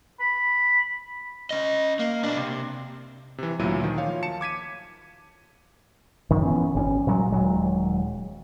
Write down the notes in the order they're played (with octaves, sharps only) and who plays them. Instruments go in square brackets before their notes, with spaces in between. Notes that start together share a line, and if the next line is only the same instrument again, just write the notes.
[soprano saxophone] B5
[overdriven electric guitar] C#4 D#5
A#3
B2 D4
C3
[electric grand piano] C3 E3
D2 A#2 F#3 E4 D#7
D#3 F3
F4 C#5 F5
A5 C#7 E7
D6 G#6 B6 D#7
[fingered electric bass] F#2 D#3
E3 B3 C#4
G#1 C4 C#4
A#2 F#3 G#3
D#1 F#3 G#3